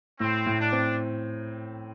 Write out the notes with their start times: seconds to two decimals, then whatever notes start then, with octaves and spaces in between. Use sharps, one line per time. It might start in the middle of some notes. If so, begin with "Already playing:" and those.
0.20 A2 C4
0.46 A2
0.60 D4
0.72 C4